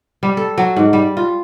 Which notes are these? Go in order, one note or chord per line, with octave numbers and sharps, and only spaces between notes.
G3
A4
F#3
G#2
G3
F4